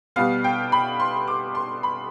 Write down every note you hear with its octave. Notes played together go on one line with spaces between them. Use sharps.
B2 G3 B3 F5
G5
B5
C6
D6
C6
B5